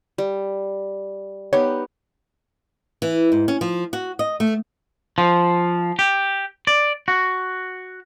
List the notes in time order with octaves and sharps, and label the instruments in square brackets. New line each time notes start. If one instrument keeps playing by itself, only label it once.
[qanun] G3
[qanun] B3 D#4 G4 [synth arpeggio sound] C#5
[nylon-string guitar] E3
G#2
C#4
F3
F#4
D#5
A3
[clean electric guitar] F3
G4
D5
F#4